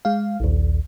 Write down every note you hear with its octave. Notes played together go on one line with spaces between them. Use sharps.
G#3 F5
A#1 D#2